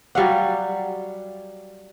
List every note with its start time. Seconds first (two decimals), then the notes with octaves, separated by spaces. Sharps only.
0.15 F#3 G3 F5 F#5